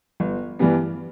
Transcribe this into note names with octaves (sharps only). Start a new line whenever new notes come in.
G1
G2 E3 G3 B3